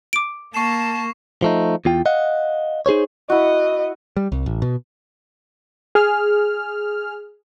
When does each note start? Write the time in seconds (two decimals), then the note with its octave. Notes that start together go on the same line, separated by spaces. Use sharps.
0.13 D6 D7
0.54 A#3 A5 C#6 C7 E7
1.42 F3 A3 D#4
1.85 E2 F4 G5
2.06 D#5 F5 F#5
2.86 D#4 G#4 C5 C#5
3.30 E4 F#4 D#5
4.17 G3
4.32 C2
4.46 A1
4.62 B2
5.95 G#4 F6